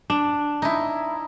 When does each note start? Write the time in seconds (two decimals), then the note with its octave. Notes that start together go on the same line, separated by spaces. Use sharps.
0.10 D4
0.62 D#4 E4